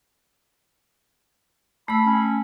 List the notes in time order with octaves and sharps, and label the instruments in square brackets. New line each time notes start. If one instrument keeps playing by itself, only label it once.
[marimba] A3 E6 [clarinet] B5
[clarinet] C#4